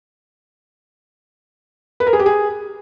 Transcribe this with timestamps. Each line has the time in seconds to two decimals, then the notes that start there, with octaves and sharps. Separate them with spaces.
2.00 B4
2.07 A#4
2.13 G#4
2.19 G4
2.26 G#4